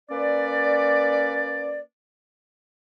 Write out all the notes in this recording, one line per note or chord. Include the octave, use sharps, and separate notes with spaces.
A#3 C#4 B4 D5